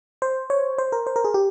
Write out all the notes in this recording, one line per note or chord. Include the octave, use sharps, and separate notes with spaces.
C5
C#5
C5
A#4
C5
A#4
G#4
G4